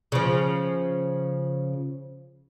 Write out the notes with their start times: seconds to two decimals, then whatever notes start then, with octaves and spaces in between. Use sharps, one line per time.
0.12 C#3 F3